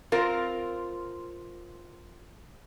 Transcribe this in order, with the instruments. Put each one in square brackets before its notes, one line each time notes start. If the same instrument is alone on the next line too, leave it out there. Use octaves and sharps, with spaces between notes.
[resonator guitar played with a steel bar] C4 F4 A#4